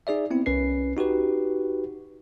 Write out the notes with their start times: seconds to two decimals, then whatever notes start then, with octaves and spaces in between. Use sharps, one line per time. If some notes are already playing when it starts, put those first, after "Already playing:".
0.07 D#4 G#4 D5 E5
0.31 B3 C4 E4
0.46 C2 C#4 B4 C7
0.97 D#4 F#4 G4 B4